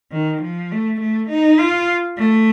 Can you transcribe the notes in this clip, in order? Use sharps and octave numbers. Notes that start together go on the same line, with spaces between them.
D#3
F3
A3
A3
D#4
F4
A3